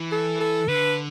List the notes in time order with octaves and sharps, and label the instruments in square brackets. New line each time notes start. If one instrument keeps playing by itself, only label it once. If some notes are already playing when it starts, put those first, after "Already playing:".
Already playing: [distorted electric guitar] E3
[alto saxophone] A4
A4
[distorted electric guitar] D3 [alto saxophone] B4